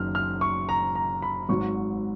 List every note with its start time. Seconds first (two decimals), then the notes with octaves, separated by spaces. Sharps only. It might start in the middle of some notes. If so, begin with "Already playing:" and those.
Already playing: F#1 F#2 D#3 F#3 F6
0.15 F6
0.41 C#6
0.69 A#5
0.95 A#5
1.22 B5
1.49 G#1 G#2 F#3 C#6